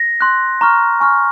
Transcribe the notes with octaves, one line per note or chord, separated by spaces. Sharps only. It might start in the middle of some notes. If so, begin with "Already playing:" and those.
Already playing: A#6
C6 F#6
A#5 C#6 F6
G#5 C#6 F6